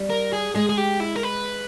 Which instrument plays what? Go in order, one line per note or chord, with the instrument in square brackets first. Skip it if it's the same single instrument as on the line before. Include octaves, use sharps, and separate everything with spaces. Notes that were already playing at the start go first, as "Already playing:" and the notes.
Already playing: [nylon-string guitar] G3
[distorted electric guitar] A#4
G#4
[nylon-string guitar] G#3 [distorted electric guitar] G#4
[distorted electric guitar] G#4
G4
E4
A#4
B4